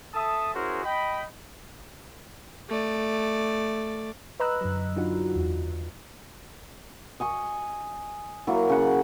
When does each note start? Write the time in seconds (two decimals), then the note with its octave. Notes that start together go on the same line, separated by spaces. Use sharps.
0.14 A4 E5 A5 D#6
0.54 C#4 E4 F#4 G#4 A#4 C5
0.84 D#5 G5 B5
2.69 A3 D5
4.40 B4 D#5 A#5 B5 E6 F#6
4.61 F#2 D3 F#3
4.96 F#3 D4 D#4 F4 F#4
5.36 E2
7.20 D#5 G#5 C#6
8.47 F#3 A#3 E4
8.69 C#3 F#5